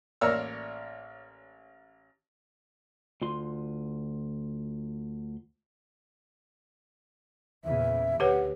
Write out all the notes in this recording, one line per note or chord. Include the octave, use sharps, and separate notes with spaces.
A1 A#3 A#4 C#5 D5 E6
D2 F4 C6
E2 A#2 C#3 E5
D2 G4 B4 C#5 F#5